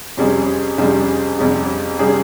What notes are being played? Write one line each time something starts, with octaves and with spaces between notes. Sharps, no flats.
F2 C3 G3 C#4 G#4
F2 C3 G3 C#4 G#4
F2 C3 G3 C#4 G#4
C3 G3 C#4 G#4